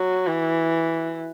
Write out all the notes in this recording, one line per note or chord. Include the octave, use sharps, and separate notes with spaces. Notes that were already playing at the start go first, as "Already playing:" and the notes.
Already playing: F#3
E3